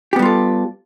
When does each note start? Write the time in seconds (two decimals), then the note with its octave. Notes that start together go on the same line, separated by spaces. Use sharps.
0.13 G4
0.16 B3
0.19 G3
0.22 F4
0.25 A4